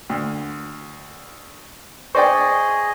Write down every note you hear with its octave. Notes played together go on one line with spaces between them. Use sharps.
D2
G#4 C5 D5 D#5 G5 C#6